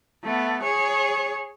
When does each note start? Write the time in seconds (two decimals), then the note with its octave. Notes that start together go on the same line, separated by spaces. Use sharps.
0.24 A3 B3
0.63 G#4 C#5